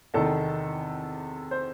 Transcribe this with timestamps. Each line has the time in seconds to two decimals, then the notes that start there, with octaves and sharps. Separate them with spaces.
0.14 E2 C3 D#3 A4
1.51 C5